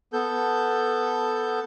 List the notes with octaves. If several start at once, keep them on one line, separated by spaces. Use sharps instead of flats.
B3 A4 G6